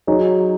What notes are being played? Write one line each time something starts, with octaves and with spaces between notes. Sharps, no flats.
F#3 D#4 G#4 C#5